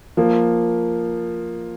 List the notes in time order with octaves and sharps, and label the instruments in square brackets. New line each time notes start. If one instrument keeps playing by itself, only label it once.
[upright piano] F3 A#3